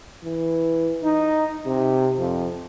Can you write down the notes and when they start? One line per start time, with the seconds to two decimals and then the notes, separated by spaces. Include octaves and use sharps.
0.24 E3
1.03 D#4
1.65 C3
2.18 F2